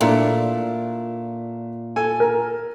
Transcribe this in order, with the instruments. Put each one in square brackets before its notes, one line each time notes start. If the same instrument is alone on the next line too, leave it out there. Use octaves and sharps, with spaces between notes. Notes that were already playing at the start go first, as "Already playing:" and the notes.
[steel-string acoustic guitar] A#2 [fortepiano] A3 D4 E4
[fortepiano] A4 G#5
[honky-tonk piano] A#4